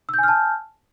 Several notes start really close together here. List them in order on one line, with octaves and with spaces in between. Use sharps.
E6 G6 G#5 F6 A5